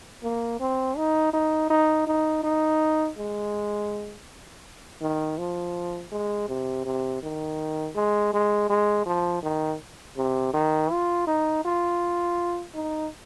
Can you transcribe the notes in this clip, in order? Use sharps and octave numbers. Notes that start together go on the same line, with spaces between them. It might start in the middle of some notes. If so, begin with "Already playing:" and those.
A#3
C4
D#4
D#4
D#4
D#4
D#4
G#3
D#3
F3
G#3
C3
C3
D#3
G#3
G#3
G#3
F3
D#3
C3
D#3
F4
D#4
F4
D#4